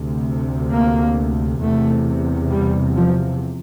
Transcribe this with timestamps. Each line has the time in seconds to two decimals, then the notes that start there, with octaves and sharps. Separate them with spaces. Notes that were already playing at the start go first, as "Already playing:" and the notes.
Already playing: D2 C3
0.72 A#3
1.61 E2 C3 A3
2.50 G3
2.95 F3